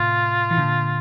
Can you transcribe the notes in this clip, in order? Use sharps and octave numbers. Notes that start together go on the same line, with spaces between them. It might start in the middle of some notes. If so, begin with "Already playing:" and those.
Already playing: A2 C3 F4
E3
A#2 D3